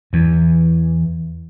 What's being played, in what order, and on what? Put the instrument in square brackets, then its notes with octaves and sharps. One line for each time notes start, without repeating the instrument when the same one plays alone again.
[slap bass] E2 [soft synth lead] E3